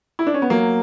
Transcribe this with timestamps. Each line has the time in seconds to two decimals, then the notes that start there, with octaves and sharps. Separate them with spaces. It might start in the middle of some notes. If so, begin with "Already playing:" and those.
0.19 E4
0.27 D4
0.34 C#4
0.42 B3
0.50 F#3 A#3